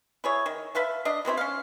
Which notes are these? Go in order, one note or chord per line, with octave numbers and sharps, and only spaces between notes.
E4 G#4 C#5
D#3
B4 E5 F5 A5
D4 D#5
F#3 B3 C4 E4
C#4 F5